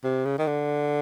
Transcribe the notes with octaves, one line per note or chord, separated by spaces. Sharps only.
C3
C#3
D#3
D3